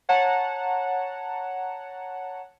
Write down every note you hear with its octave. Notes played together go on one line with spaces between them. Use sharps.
C#5 F#5 A5 A#5